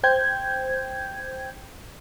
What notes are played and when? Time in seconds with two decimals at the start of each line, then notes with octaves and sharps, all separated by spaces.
0.03 C5 G5 G6 G#6